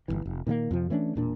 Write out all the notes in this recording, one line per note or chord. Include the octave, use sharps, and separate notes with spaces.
G1 C#2 E3
F1
A#2 D#3 F#3 A#3
F2 C3 F3
E3 A3 C#4 D4
E1 A#2 D4